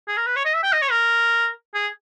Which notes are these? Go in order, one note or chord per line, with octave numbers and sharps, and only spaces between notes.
G#4
A#4
B4
C#5
D#5
E5
G5
D#5
C#5
A#4
G#4